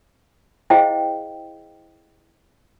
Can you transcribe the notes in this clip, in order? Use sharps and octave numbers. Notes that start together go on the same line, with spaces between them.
E4 G#4 C5 D#5 F5 G5